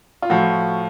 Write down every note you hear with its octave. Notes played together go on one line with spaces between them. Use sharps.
F4
A2 F3 F#4